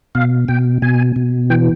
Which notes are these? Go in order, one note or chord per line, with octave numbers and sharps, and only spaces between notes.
B2 F5
B2 G5
B2 G#5
B2
E3 G5